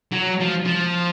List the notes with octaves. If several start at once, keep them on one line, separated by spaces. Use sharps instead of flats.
F#3
F3
F3